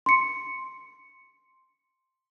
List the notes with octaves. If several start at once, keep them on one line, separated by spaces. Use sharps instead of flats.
C6 C#7